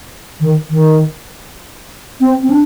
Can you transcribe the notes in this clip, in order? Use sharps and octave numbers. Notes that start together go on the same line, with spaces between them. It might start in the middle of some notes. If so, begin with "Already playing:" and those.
D#3
D#3
C4
C4
D4